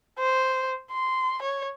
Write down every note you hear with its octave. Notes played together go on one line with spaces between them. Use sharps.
C5
C6
C#5